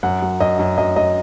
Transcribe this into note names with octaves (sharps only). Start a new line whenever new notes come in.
F#2 F#5
F#3
F#2 D#5
F#2
F#2 D#5
F#3 D#5